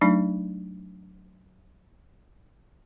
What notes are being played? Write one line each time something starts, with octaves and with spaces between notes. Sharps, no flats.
F#3 A3 D4 D#4